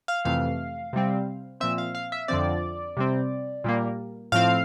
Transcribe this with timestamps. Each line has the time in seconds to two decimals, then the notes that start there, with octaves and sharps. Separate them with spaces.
0.08 F5
0.25 F2 C3 E3 A3 F5
0.93 C3 G3 C4
1.60 A#2 F3 C4 E5
1.78 F5
1.95 F5
2.12 E5
2.28 F2 D3 F3 C4 D5
2.97 C3 G3 C4
3.64 A#2 G3 A#3
4.32 A2 F3 C4 F5